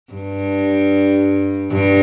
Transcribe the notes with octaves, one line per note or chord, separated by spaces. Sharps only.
G2
G2